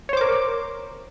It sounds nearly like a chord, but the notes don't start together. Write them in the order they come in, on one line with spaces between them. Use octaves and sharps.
C#5 C5 D6 A#4